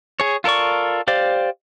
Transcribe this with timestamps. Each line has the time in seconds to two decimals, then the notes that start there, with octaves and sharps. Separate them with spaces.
0.20 G#4 C#5
0.44 F4 A4 A#4 D5 C#6
1.08 G4 C5 D5 F5